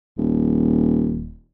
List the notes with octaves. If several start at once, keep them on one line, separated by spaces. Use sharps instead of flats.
D#1